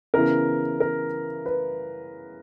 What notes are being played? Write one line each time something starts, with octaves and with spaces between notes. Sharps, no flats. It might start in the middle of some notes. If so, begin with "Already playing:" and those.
C#3 E3 B3 E4 A#4
A#4
B4